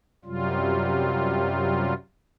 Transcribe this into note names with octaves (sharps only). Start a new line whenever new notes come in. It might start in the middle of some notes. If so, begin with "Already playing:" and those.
F#2 C3 F#3 G3 F4